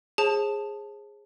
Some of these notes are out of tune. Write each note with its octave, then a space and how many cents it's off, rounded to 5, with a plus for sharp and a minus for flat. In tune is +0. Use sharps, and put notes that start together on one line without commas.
G#4 -5 C5 +45 A5 +0